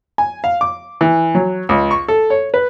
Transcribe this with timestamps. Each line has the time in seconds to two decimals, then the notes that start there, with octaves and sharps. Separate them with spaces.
0.18 G#5
0.44 F5
0.61 D6
1.01 E3
1.35 F#3
1.69 C#2
1.91 C#6
2.08 A4
2.30 C#5
2.54 B4